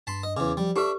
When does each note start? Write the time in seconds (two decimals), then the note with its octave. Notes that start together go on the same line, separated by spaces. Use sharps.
0.07 G2 A5 B5 C6
0.23 D#5
0.37 E2 C#3 D6
0.57 F3 G3
0.76 D4 G4 A4 B4 E5 C#6